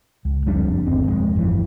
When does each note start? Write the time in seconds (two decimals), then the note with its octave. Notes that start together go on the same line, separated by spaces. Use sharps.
0.25 C#2
0.46 F#1 F2 G3 D4
0.86 G1 D#2 C4
1.07 D#1 F2 G#3
1.35 G1 F2 C#3 E3